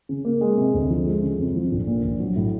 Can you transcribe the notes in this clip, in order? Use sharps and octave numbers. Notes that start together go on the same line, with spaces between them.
C#3
A#3
G#3
C3
D2
F3
G#3
C#3
F2
F3
A#1
A#2
A#1
F#3
A2